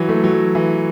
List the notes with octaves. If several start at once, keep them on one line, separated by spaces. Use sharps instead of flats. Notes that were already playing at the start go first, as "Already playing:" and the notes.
Already playing: E3 F#3
A3
F#3
E3